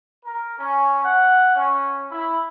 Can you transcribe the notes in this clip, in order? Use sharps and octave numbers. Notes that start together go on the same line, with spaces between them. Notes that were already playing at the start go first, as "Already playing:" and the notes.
A#4
C#4
F#5
C#4
E4